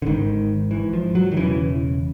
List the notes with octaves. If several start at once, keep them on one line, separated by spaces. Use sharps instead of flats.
D3
G#1 G#2 D#3
G#1 G#2 E3
F3
F#3
D#3
E1 E2 C#3 E3